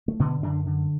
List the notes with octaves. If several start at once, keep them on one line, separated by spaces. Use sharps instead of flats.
A3
B2 D3 B3
F#2 D3 D4
D3